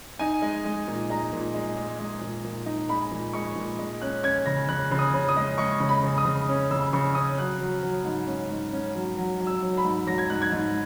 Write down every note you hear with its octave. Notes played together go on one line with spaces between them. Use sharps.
D#4 G#5
G#3
G#3
A#2
G#3 A#5
A#2
G#3
G#3
G#3
A#2
A#2
D#4
G#3 B5
A#2
G#3 C#6
A#2
G#3
C#4 F#6
C#4 G#6
C#3 A#6
C#3 F#6
C#3
D#6
C#3
D#6
G#3
G#3 C#6
C#3
B5
C#3
D#6
C#3
C#4
C#3 E6
C#3 C#6
C#4 D#6
F#3 F#6
F#3
F#3
G#2
C#4
G#2
C#4
F#3
F#3
F#3
E6
F#3
B5
G#2
F#3 A#6
G#6
G#2 F#6
G#6
G#2